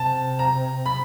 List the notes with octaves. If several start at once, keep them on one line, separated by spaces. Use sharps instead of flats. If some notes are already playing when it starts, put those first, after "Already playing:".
Already playing: C3 A5
A#5
B5